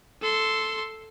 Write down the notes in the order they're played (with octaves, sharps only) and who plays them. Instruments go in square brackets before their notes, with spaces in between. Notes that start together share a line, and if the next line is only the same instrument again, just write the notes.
[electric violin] A4 C6